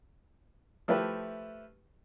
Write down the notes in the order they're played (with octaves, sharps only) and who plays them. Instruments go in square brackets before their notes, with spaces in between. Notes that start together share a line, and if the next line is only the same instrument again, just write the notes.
[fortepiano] F3 A3 E4 G4 B4